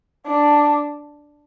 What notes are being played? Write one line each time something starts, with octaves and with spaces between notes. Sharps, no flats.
D4